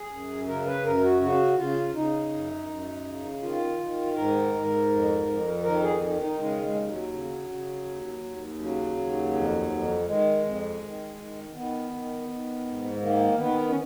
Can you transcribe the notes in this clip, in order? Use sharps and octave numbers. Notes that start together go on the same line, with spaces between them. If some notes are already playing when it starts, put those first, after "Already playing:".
Already playing: G#4
F#2
C#3 A#4
B4
F#2 A#4
F#4
C#3 F#4
C#3 F4
C#3 D#4
F#2
F#2
C#3
D#3 F4
D#3
G#2 A#4
G#2
F2
F2
D#3 A#4
G#4
D#3
D#4
C#3 G#3
G#3
D#2
F#3
C#3
C#3
D#2
D#2
C#3 F#3
D#2
F2
F2
D#3 G#3
F2
D#3
D#3
D#3 B3
D#3
D#3
G#2
D#3 A#3
D#3 B3
C#4